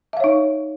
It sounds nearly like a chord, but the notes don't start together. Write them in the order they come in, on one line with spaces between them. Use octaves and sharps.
E5 F5 C#5 D#4